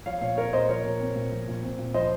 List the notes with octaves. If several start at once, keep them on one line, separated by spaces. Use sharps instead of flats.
F3 C#5 F5
A#2 C#5 F5
C4 A#4 C#5
A#2 C5 D#5
F3 A#4 C#5
A#2
C4
A#2
F3
A#2
C4
A#2
F3 C5 D#5